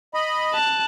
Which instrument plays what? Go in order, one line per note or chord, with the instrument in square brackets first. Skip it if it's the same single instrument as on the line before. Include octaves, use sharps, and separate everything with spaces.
[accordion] D#5 B5
[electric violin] A5 F#6